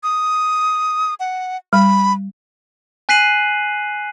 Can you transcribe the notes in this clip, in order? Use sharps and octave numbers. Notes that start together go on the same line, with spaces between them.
D#6
F#5
G3 B5
G#5 F#6 B6 C7 D#7 F#7